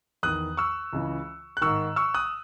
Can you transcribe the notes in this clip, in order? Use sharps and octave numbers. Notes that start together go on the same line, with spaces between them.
E2 D#3 D#6 F#6
C#6 E6
C#2 C#3 E3
F#6
G#2 D#3 C#6 E6
C#6 E6
D#6 F#6